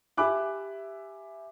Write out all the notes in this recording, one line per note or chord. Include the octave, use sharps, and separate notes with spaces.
G4 E5 G#5 B5 D6 F#6